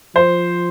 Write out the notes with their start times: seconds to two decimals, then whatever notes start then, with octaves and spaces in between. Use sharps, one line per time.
0.15 F3 C5